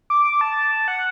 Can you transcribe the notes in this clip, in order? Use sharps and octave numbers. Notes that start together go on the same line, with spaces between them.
D6
D6
A5
F#5